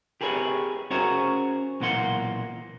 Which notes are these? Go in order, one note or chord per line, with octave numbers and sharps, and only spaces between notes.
G4 G#4 A#4 B4 C#5
C#4 F#4 G#4 A#4 C5 C#5
B1 A#2 E3 A#3 F#5 C6